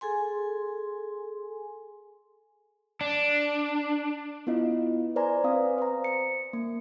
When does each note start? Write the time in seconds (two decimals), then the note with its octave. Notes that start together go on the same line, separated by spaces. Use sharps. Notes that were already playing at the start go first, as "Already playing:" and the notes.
0.01 G#4 A4 G#5 C6
3.01 D4
4.47 B3 E4 F4 D#5
5.16 B4 C5 D5 G#5 A#5
5.44 C4 F5 D#6
5.78 C5 A#5
6.04 C#7
6.53 A#3